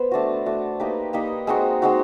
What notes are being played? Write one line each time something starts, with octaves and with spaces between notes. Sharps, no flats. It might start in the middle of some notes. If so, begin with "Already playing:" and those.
Already playing: B3 C5
A3 D4 F#4
A3 D4 F#4
A#3 D#4 G4 B4
A#3 D#4 G4 B4
G#3 C4 D#4 F#4
G#3 C4 D#4 F#4